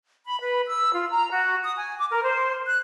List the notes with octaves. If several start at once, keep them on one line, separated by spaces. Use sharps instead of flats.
B5
B4
E6
F4
A#5
F#4
D#6
G#5
D6
A#4
C5
F#6